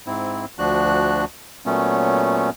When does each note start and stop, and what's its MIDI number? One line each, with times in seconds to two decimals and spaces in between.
0.07 0.45 44
0.07 0.45 60
0.07 0.45 64
0.59 1.25 38
0.59 1.25 53
0.59 1.25 62
0.59 1.25 66
0.59 1.25 90
1.66 2.50 46
1.66 2.50 54
1.66 2.50 57
1.66 2.50 59
1.66 2.50 61